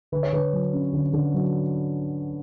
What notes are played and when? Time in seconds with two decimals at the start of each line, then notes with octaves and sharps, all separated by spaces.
0.12 D3 B4
0.23 C#5
0.32 D3 B4
0.53 F#3
0.73 C#4
0.93 D3
1.13 D3
1.34 F#3